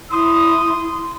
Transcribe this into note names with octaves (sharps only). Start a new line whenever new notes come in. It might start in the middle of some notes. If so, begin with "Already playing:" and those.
E4 C6 D#6